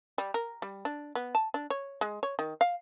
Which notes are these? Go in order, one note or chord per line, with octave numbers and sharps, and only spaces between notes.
G3
A#4
G3
D4
B3
A5
D4
C#5
G#3
C#5
D#3
F5